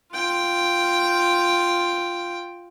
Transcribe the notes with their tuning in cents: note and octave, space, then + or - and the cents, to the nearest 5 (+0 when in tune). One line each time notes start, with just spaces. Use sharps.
F4 +0 G5 +0